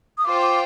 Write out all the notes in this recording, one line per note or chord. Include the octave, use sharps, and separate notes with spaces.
D#6
F4 C5 G5 D6
D6